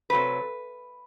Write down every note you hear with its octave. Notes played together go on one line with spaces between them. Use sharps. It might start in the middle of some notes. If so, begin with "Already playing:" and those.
C3 F#3 A3 B4